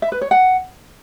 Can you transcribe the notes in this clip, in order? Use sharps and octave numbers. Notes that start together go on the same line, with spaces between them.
E5
B4
C#5
F#5